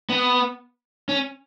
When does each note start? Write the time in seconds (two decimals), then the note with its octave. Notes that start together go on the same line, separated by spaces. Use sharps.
0.09 B3
1.09 C#4